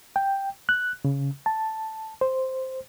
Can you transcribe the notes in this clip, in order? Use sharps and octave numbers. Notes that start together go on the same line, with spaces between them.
G5
F#6
C#3
A5
C5